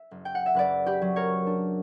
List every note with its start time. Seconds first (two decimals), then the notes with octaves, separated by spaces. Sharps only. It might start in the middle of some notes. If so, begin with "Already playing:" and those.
Already playing: E5
0.11 F#1
0.25 G5
0.35 F#5
0.46 E5
0.54 F#1 B4 D5
0.86 G4 B4
1.02 F#3
1.16 A#4 C#5
1.46 D4